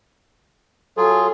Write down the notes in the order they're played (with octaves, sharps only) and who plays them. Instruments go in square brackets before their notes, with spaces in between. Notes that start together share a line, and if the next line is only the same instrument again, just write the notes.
[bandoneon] F#3 F4 G#4 [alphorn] A4